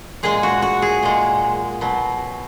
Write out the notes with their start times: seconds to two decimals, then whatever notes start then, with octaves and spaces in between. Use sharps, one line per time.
0.23 A#2 G#3 G#4
0.43 F#4
0.62 F#4
0.82 G#4
1.03 A#2 G#3
1.81 B2 F#3